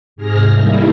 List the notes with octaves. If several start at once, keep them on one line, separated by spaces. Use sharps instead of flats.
G#2 C3 G#4 F6 A#6
D#3 G3 A#3 E4